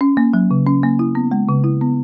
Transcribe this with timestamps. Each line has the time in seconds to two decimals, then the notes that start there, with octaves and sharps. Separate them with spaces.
0.01 C#4
0.17 A#3
0.34 F#3
0.51 C#3
0.67 C#4
0.83 A#3
0.99 E4
1.15 B3
1.31 G#3
1.49 C#3
1.64 E4
1.81 B3